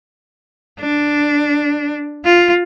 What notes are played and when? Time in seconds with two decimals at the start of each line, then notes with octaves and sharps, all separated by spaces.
0.80 D4
2.25 F4